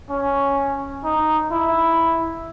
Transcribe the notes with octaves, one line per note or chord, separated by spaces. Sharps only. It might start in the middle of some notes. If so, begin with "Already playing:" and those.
C#4
D#4
E4